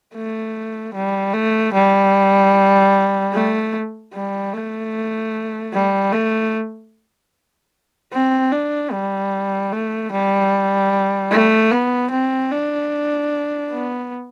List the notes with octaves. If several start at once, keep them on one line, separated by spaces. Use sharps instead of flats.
A3
G3
A3
G3
A3
G3
A3
G3
A3
C4
D4
G3
A3
G3
A3
B3
C4
D4
B3